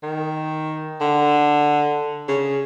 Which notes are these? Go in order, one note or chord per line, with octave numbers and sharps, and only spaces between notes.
D#3
D3
C#3